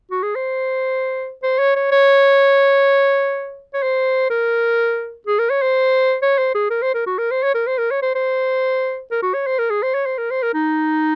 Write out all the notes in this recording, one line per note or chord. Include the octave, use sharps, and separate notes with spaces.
F#4
G#4
C5
C5
C#5
C#5
C#5
C#5
C5
A#4
G#4
A#4
C#5
C5
C#5
C5
G#4
A#4
C5
A#4
F#4
A#4
C5
C#5
A#4
C5
A#4
C#5
C5
C5
A#4
F#4
C#5
C5
A#4
G#4
C5
C#5
C5
A#4
C5
A#4
D#4